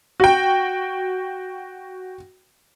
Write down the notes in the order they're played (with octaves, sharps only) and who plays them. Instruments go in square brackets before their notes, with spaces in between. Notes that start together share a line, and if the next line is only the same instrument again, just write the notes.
[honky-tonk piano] F#4 G5